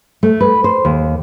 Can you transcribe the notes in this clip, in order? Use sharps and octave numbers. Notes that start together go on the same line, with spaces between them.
A3
B4
C5
D#2